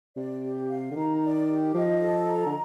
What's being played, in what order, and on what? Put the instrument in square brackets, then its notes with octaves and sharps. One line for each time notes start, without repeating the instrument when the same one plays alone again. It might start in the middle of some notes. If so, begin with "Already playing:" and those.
[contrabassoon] C3 [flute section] D5
[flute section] G4
F5
[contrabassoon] D3
[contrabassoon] D#3 [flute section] A#5
[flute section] D5
G4
[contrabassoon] F3 [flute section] D#5
[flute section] A4
A#5
[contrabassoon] D3